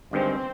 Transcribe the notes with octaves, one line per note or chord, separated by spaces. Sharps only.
G1 G2 D#3 G#3 C4